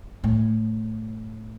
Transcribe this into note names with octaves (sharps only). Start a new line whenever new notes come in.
A2